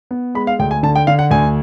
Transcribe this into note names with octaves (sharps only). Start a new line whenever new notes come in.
B3
G#3 B5
F5
D2 G5
G#5
D3 A5
G5
D3 F5
F#5
D2 G#5